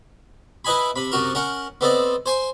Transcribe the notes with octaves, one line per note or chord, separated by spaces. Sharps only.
E4 B4 D#5 G#5 B5
C3 B5
F#2 C3 F#4 A#4
C#4 A#4 F#5
B3 C4 A4 D5 D#5
C5 G#5 C6